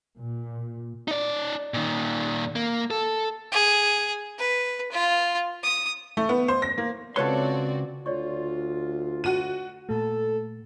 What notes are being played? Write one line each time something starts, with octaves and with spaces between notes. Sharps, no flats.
A#2
D#4 D5
A#2 D#3
A#3
A4
G#4
B4
F4
D#6
A3
B3
C5
A#6
A#3
C#2 C4 F#4 A4 B4 C#5 D5 C6
D2 F4 C#5 D5 C#6
F#4 D#7
A#2 A3 A4